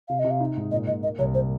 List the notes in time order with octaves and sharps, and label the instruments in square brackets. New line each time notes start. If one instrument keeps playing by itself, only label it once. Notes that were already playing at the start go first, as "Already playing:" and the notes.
[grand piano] C3 [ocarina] F5
[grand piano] C3 [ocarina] D#5
[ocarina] F5
[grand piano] D#4
G#2
[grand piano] A#2 [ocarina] D#5
[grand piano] A#2 [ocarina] D#5
[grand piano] A#3 [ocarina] D#5
[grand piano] C2 [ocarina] C#5
[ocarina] C5